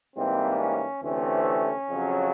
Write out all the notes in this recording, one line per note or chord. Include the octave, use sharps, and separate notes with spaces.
G#2 E3 G3 A#3 C4
C#4
D2 C3 E3 A3 C4 C#4
F2 C#3 F#3